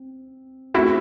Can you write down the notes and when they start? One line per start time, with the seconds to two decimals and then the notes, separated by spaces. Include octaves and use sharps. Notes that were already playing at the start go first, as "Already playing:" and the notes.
Already playing: C4
0.74 A3 C4 D#4 E4 F#4 G#4